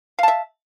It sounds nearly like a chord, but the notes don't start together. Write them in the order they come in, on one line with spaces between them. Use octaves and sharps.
F5 A5 E5